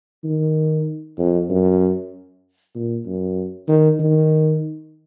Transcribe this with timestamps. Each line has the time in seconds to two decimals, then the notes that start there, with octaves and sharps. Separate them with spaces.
0.24 D#3
1.18 F2
1.50 F#2
2.75 A#2
3.06 F#2
3.68 D#3
4.00 D#3